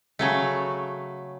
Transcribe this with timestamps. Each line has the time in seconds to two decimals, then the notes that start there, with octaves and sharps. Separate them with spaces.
0.19 C#3 F#3 A3